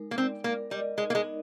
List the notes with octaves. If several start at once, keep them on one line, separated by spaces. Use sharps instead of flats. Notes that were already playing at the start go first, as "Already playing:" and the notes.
Already playing: G#3 D#4 A#4
A#3
C4 D5
A#3 A#4
G3 D#5
G#3 D#4
A#3
G#3
D#4